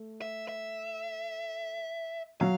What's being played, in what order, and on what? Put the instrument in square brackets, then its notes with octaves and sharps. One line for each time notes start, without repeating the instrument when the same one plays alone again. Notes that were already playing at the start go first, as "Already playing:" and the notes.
Already playing: [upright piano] A3
[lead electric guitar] E5
E5
[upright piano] F#3 [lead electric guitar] F5